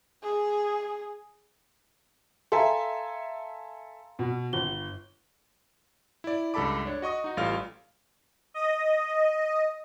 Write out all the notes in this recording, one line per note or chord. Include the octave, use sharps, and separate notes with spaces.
G#4
A4 E5 F5 G#5 A#5 C6
B2
G1 G7
E4 D5
C#2 G2 A4 A5 B5 D6
D4 C#5
F#4 D#5 C#6 D#6
D#4 F#4
A1 G3 F4 A4 F5 F6
D#5